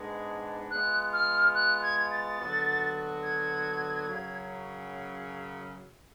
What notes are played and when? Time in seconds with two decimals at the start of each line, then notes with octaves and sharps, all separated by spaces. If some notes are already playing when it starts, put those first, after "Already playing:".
Already playing: G#2 G#3 B3 D4
0.70 G#3 B3 F4 F#6
1.13 F6
1.55 F#6
1.83 G#6
2.11 A6
2.39 D3 F#3 B3 F#4
3.23 G#6
4.08 F#2 C#3 F#3